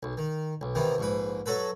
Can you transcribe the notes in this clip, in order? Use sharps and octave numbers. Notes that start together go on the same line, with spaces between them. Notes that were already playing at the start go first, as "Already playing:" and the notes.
B1
D#3
B1
C3 D#3 E3 B3
A#1 G#2 B4
F#3 F#4 A4 B4